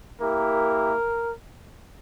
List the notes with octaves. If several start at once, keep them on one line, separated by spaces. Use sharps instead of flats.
A#3 E4 G4 A#4